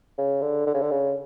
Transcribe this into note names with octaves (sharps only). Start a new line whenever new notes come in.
C#3
D3
D3
C#3
D3
C#3